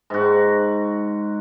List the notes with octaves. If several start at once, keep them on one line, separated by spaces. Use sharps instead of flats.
G#2 F#4